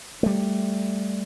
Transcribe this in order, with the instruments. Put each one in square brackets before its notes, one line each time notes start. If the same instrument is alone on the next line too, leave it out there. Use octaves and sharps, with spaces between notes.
[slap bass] G3 A3